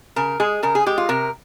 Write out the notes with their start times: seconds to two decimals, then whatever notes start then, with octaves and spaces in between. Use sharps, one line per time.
0.16 C#3 A#4
0.40 G#3 G#4
0.63 C#3 A#4
0.75 G#4
0.86 G#3 G4
0.98 F4
1.09 C3 A#4